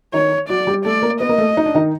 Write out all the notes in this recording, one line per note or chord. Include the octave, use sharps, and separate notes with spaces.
D#3 D#4 C#5
F#3 F#4 D5
G3 G4
A3 A4 D5
A#3 A#4
B3 B4 D#5
A#3 A#4
A3 A4
D#4
D4
D#3 D#4